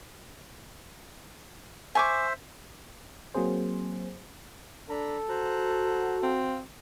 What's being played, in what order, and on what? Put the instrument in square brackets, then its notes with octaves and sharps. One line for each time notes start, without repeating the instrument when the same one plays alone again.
[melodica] C5 E5 [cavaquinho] G#5 C#6 D6
[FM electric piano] F#3 A#3 C4 G#4 C5
[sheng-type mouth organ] D4 A#5 B5 [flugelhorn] A4
[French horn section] F#4 [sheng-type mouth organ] C5 A#5 F#6
[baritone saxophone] C4 [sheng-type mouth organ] F5